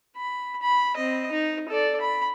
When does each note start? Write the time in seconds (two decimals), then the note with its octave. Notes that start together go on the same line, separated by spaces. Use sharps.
0.16 B5
0.62 B5
0.96 C4 D#5
1.31 D#4
1.69 A4 D5
2.01 B5